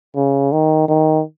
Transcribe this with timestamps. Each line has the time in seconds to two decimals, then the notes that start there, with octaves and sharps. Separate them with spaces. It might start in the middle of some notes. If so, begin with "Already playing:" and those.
0.16 C#3
0.52 D#3
0.88 D#3